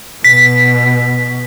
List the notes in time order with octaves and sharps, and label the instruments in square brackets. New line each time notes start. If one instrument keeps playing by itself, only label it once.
[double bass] B2 [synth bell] B6